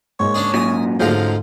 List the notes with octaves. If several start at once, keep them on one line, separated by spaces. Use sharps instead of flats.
G#2 G#3 A#3 C#5
C#4 D4 G#4
F#2 A#2 G#5 D#6
D2 G#2 F3 C#4 G#4 A#4 F5